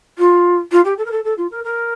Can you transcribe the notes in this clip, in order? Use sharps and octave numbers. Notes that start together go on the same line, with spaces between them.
F4
F4
G4
A4
A#4
A4
A4
F4
A#4
A#4